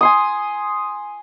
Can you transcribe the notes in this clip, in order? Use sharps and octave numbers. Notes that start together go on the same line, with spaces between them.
G#5 C6 D#6